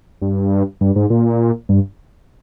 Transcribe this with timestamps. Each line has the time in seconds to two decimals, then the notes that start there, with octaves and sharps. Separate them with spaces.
0.22 G2
0.81 G2
0.96 G#2
1.10 A#2
1.69 G2